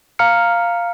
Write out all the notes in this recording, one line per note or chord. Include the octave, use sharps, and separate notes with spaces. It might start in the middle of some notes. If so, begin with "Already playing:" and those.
F5 A#5 F6 C#7